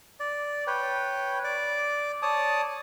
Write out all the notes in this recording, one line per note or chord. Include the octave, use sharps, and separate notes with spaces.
D5
B4 C#5 G5
D5 D6
C#5 D5 A5 D#6